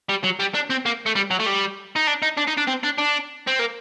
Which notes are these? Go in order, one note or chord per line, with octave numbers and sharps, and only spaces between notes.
G3
F#3
G3
D4
C4
A#3
A3
G3
F#3
A3
G3
D#4
D4
D#4
D4
D#4
D4
C4
D4
D4
C4
A#3